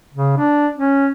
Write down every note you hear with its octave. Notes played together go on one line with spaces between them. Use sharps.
C#3
D4
C#4